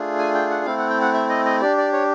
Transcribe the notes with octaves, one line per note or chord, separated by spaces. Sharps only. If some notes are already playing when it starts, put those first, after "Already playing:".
Already playing: A3 D4 F4 G#4
G#5
G5
F#5
A3 C4 E4 F5
F#5
G5
F#5
E5
D#5
D#5
D4 G4 D5
D5
C#5